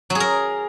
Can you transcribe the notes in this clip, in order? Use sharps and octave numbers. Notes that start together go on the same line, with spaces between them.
F#3
G#4
A#4